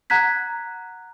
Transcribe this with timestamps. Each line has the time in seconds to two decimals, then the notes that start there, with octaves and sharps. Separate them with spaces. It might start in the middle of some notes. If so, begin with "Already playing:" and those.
0.10 F#5 A#5 F#6 G#6 B6